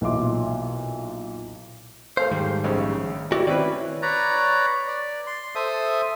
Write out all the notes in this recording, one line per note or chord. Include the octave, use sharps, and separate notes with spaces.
B1 A#2 E3 E5 C6 D6
A4 C5 F5
G#2 D#3 G3
A#1 C#3
E4 F#4 G4 D5
D#3 C4 C#4 E4 B4 D5
B4 C#5 D5 A#5
D5
C6
A4 C5 E5 D#6